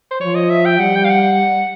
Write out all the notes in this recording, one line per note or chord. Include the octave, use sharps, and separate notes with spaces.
C5
F3 C#5
D#5
E5
G5
G3 F#5
G5
F5
F#5